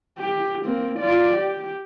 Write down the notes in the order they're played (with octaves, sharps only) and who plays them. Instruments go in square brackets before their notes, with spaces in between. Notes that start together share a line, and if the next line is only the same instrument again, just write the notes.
[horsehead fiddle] G4
A#3 C4
F4 D5
G4